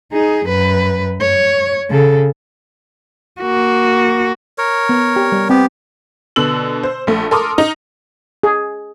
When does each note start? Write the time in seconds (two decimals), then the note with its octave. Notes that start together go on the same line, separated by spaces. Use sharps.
0.13 D#4 G#4
0.45 F#2 B4
1.21 C#5
1.90 C#3 A4
3.41 A#3 F#4
4.58 A#4 C#5
4.89 B3
5.16 G4
5.32 G3
5.50 B3 C4 G4
6.36 B2 D3 E6 F#7
6.83 C5
7.07 A#1 A3
7.31 A4 A#4 C6 D6 D#6 F6
7.58 D#4
8.43 G#4